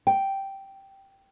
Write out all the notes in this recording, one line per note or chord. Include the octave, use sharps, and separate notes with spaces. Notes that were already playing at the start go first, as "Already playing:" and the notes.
G5